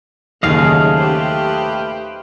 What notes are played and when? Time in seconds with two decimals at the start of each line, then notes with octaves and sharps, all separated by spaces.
0.43 D#2 C#3 F#3 A3 G#4 D#5 F5
0.97 G4 B4 C5